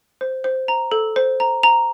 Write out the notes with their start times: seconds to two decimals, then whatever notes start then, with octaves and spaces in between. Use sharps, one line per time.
0.21 C5
0.44 C5
0.68 A#5
0.92 A4
1.16 C5
1.40 A#5
1.63 A#5